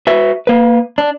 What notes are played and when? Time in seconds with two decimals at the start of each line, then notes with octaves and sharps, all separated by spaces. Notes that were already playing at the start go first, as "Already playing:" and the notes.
0.07 F#4 B4 E5
0.47 A#3 B4
0.98 D4